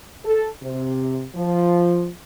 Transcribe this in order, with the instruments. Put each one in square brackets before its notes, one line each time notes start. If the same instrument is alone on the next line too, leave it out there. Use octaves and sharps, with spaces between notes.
[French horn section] A4
C3
F3